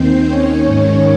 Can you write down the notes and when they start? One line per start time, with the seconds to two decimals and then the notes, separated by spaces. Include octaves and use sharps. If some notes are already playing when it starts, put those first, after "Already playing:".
Already playing: D#2 D#3 C4 C5
0.28 C#4 C#5
0.66 G#2 D#3